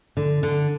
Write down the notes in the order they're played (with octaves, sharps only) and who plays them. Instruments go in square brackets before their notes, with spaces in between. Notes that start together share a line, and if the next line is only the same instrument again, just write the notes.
[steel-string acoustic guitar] D3
D3